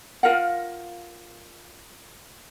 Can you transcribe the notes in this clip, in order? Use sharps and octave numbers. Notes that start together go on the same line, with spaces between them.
F4 A#4 F5 F#5